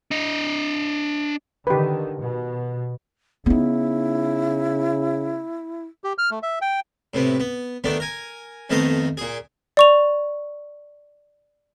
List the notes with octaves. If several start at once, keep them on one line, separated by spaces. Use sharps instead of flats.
D4 D#5
D3 D#3 G4 B4
B2
C#3 B3 D#4 E4
G4
F6
A3
E5
G5
A2 C3 B3
B3
D#3 A3 B3 D4
A#4 G#5
F2 D#3 A3 B3 D#5 F5
A#2 G#4
D5 C#6 F7